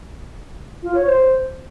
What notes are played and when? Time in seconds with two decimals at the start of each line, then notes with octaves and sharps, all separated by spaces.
0.83 F4
0.95 C#5
1.07 C5